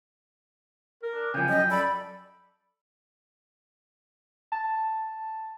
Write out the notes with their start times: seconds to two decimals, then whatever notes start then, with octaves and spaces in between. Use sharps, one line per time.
1.03 A#4
1.14 D4
1.34 C#3 F3 G5 G#5
1.49 F#2 D#5
1.71 A4 D5 B5
4.52 A5